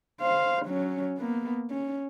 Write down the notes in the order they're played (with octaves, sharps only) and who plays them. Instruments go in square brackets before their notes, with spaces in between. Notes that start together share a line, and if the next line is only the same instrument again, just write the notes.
[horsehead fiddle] C5 F5
F#3 C#4
A#3 B3
C#4